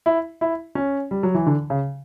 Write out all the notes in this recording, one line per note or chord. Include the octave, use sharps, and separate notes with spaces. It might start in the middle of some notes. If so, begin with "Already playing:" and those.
E4
E4
C#4
G3
F#3
E3
D3
C#3